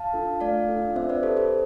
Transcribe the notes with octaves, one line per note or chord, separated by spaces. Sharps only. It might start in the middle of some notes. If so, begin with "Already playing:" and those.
Already playing: F5 A5
D4 F4 A4
A3 D5 F5
D4 F4 A4
C4 C5 E5
B4 D5
G4 A4 C5
A4 C5